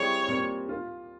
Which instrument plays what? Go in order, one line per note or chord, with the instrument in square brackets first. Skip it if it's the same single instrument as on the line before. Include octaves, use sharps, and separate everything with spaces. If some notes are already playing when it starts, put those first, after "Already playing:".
Already playing: [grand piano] G3 C4 E4 G#4 C5 [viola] C#5
[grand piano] A#2 G3 C4
F4